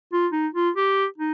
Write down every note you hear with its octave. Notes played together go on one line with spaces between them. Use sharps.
F4
D#4
F4
G4
D#4